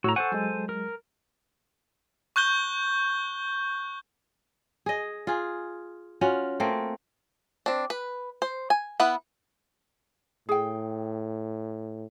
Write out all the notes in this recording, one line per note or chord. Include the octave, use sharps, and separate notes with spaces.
A2 F#4 C#5 A#5 E6
A4 C5 F#5 G#5 C#6
F#3 G#3
A#4
C#6 F#6 G6 G7
G#4 D#5
F4 G#4
C#4 F4 F#4
A3 A#3 C4
C4 D4
B4
C5
G#5
B3 E4 B4 F#5
A2 G#4 G5